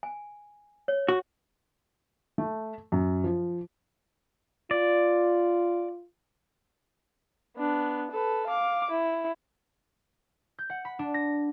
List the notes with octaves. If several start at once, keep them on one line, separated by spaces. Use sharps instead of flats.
G#5
C#5
F#4
A3
F#2
F3
F4 D5
B3 D4
A4 B4
F5 D6
E4
G6
F#5
B5
D4
A#6